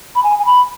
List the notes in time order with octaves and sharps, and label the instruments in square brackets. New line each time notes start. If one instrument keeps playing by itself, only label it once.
[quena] B5
G#5
G#5
B5